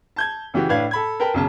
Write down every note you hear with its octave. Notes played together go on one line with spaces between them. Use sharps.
A5 G6 G#6
C#3 E3 F#4 G4
A2 D4 B4 F5 G#6
A4 B5 G#6
A#4 B4 G5 A5 B5
B1 C#3 A5